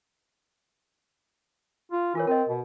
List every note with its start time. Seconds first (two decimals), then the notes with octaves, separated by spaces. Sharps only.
1.92 F4
2.15 E3 F4 A#4 C#5
2.27 C4 A#4 D#5
2.49 B2